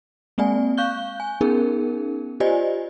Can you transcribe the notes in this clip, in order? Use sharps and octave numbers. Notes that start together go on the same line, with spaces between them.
G#3 A#3 C4 D5 G#5
F5 C#6 F#6 G6 G7
G#5
B3 C#4 D#4 G#4 A#4
F4 G4 C5 D5 D#5 G#5